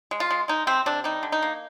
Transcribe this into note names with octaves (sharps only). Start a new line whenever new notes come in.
G#3
F4
G#3
G#3 D#4
C3 C4
C3 D4
G3 D#4
D3
D#4
A#3